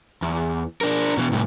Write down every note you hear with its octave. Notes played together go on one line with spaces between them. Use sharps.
E2
D4 A#4
B2 E3
C2 A2